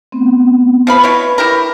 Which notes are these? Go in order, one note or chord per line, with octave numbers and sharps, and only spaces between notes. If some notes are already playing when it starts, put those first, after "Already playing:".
A3 B3 C4
F3 B4 F5 B5
B2 E4 C#5
E4 G4 A#4